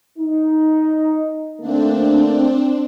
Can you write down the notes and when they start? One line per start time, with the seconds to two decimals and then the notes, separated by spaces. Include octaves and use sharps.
0.18 D#4
1.60 D3 A3 A#3 C4 D4